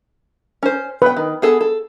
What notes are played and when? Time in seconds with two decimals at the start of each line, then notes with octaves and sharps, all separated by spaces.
0.63 C#4 C5
1.02 B3 B4 G5
1.17 D#3
1.42 B3 G#4 A4
1.61 A4